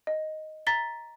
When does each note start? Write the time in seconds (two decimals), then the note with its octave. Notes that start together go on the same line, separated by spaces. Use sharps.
0.07 D#5
0.67 A#5 A6 B6 G7